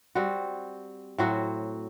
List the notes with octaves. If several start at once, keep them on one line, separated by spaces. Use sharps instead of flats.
G3 C4 F#4
A2 F#3 C4 F#4